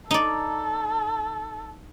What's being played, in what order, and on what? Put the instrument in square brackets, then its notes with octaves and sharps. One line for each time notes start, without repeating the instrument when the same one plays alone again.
[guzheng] D#4 D5 [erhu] A4